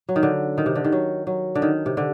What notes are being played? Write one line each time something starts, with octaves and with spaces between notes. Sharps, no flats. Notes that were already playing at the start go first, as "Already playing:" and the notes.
F#3
D#3
D3
D#3
C3
D3
D#3
F#3
F#3
D3
D#3
C3
D3